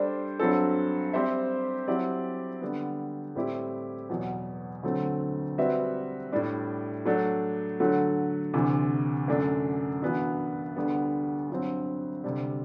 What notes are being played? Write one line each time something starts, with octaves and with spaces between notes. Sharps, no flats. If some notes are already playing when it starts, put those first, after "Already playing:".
Already playing: G3 D4 A4 C5
G2 F#3 C4 F#4 A4
G3 C4 G4 C5 E5
F#3 C4 E4 G4 D5
D3 G3 B3
A2 G3 C4 E4 G4
E2 B2 F#3
D2 D3 F#3 A3 C4
G3 C4 F#4 B4 E5
A2 G3 D4
F#3 A3 D4
D3 F#3 A3
D2 C3 E3
F#2 D3 A3 D4
G2 E3 B3 D4 F#4
D2 D3 G3 B3
G2 F#3 C4
D2 C3 G3